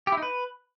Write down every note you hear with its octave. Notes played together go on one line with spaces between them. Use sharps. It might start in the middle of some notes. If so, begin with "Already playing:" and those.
G4
E4
D#4
B4